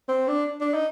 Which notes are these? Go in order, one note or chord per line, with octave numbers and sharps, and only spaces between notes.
C4
D4
D4
D#4